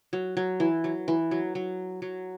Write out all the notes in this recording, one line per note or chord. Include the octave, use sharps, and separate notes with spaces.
F#3
F#3
E3
F#3
E3
F#3
F#3
F#3